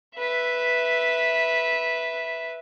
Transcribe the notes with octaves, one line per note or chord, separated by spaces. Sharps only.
B4 E5